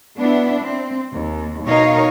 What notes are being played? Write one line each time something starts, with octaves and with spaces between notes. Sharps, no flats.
B3 D4 E4
C4
D#2
B2 D#4 A#4 C#5 F5